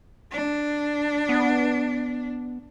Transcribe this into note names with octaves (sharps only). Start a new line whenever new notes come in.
D4
B3